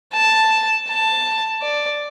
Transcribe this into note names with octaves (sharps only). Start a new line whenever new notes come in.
A5
A5
D5